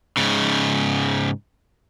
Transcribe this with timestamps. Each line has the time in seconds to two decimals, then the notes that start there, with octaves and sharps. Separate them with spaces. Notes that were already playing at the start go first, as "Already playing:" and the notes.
0.17 G#2 C#3